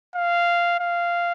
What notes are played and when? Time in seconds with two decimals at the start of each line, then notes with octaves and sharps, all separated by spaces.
0.15 F5
0.80 F5